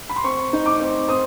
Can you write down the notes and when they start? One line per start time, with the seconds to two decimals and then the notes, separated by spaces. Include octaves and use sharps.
0.09 B5
0.16 C6
0.24 C4 C#6
0.53 D#4
0.66 D6
0.80 C4
1.09 C4 D#6